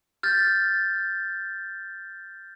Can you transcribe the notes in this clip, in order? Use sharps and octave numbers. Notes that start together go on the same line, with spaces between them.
F6 G6 A6